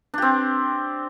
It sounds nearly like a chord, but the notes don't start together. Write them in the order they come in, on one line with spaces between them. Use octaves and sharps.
D4 G4 C4